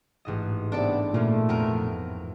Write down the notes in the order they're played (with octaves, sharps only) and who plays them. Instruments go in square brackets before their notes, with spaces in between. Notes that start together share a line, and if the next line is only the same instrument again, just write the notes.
[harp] A1 G#2 D#5
[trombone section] C3 B3 [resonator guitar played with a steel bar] D4 A4 D5
[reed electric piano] A#2 [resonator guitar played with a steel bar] C#3 E3 F3 [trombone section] A3
[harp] F2 [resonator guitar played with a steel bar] C3 B3 A#4